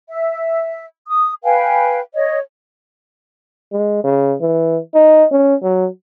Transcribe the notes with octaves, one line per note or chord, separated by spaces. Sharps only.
E5
D#6
B4 F5 G5 G#5
C#5 D#5
G#3
C#3
E3
D#4
C#4
F#3